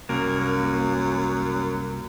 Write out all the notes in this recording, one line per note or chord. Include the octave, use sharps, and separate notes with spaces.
C2 F#2 A#3